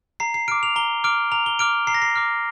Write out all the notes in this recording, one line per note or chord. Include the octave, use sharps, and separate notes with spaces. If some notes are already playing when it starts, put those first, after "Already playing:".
A#5 C7
C7
D6 F6 D7
F7
A#5 G7
D6 F6 D7
A#5 F7
G7
D6 F6 D7
A#5 C7
A#6
C7
D6 F6